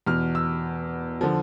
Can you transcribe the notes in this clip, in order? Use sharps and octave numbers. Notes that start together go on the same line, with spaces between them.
E2 B2 F6
E6
D3 F3